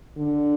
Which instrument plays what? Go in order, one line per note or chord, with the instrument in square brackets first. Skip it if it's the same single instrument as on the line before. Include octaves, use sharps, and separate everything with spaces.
[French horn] D3